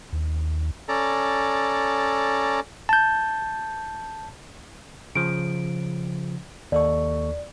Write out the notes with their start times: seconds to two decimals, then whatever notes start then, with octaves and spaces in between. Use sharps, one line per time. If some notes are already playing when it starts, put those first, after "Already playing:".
0.13 D#2
0.89 C#4 A4 D5 A#5
2.89 A5 G6
5.15 C#3 F3 D7
6.72 D#2 A4 D5 C#6